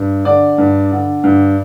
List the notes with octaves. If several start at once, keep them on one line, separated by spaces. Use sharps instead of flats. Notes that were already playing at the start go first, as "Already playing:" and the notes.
Already playing: G2
D3 D5
G2
D3
G2